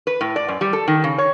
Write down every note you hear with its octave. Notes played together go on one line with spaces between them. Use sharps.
B4
A2
D5
F#2
G3
A4
D#3
C#3
C#5